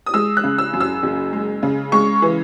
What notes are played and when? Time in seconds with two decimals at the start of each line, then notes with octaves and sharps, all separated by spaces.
0.06 D#6
0.14 G#3 E6
0.37 F#6
0.44 C#3
0.58 E6
0.73 F#2
0.80 E6
1.03 F#1
1.33 G#3
1.63 C#3
1.92 G#3 C#6
2.22 E3